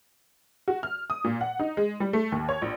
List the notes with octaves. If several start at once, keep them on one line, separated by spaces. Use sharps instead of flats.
F#4
F6
D#6
A#2
F#5
D#4
G#3
G3
A3
D#2
C#5
A#1